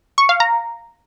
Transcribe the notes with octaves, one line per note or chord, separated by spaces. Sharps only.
C#6
F5
A#5